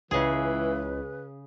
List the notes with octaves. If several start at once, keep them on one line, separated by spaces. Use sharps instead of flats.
C#2 C#3 E3 G#4 B4